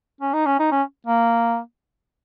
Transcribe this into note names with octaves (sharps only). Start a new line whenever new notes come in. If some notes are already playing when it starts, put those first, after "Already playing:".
C#4
D#4
C#4
D#4
C#4
A#3